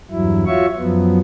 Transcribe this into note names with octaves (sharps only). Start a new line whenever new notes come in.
E2 G2 F#3 E4
F4 F#4 C#5 E5 C#6
F#2 F3 F#3 B3